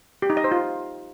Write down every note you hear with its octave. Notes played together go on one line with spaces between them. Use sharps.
G4
D#4
D#5
C5
F4